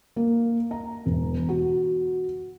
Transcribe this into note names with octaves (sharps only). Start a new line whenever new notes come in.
A#3
A#5
E1
F#4